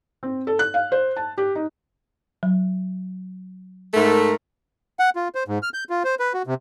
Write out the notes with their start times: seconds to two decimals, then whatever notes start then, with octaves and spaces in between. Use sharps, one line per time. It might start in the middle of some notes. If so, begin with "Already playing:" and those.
0.23 C4
0.47 A4
0.59 F#6
0.74 F5
0.92 C5
1.17 A5
1.38 G4
1.55 D#4
2.43 F#3
3.94 G#2 A3 A#4
4.99 F#5
5.16 F4
5.35 C5
5.48 G#2
5.63 F6
5.74 G6
5.90 F4
6.04 C5
6.20 B4
6.34 F#4
6.47 C3